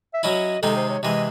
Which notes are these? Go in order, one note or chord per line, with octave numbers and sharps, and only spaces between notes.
E5
F#3 C#4 E4 D#5
C3 D#3 G#3 D#4 A4
C5
C#5
C3 E3 G#3 D#5